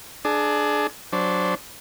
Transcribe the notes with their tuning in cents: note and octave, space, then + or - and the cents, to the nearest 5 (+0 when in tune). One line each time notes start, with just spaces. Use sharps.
D4 +15 G#4 +30
F#3 -5 D4 -10 C5 +0